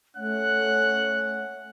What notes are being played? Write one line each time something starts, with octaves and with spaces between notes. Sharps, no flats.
A3 C#4 F#5 F#6